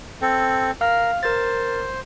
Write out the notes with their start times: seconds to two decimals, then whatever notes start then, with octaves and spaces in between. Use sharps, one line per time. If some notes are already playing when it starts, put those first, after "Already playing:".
0.22 C4 A4
0.81 A#4 F5 F6
1.23 A#4 C5 A6